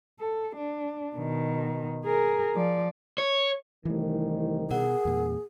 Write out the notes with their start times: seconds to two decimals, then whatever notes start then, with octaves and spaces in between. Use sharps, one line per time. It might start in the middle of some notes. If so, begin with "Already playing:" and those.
0.20 A4
0.56 D4
1.16 B2 D#3
2.05 G#4 A#4
2.55 F3 D5
3.18 C#5
3.85 C2 D#3 E3 A3
4.71 B2 G#4 A#4 F#5
5.05 E2 A#2